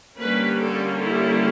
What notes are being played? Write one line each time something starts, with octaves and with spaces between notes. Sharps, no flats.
D3 G3 A#3 C#4 B4
A4
E4